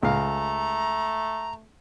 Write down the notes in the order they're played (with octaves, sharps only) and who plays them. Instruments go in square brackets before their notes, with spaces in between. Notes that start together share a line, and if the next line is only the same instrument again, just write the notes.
[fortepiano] C#2 F5 [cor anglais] A3 [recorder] A#5